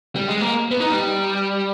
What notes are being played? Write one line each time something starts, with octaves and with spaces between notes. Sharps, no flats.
G3
G#3
A#3
B3
D#4
G3